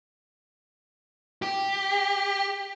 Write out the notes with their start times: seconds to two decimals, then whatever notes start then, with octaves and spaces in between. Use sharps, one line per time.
1.42 G4